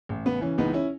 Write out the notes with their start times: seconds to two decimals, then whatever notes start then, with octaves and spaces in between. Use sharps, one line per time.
0.09 A1
0.25 C#3 B3
0.41 E3 C#4
0.58 C#2 B3 D#4
0.73 C#4 E4